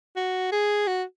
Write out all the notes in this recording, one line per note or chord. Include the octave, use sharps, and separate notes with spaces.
F#4
G#4
F#4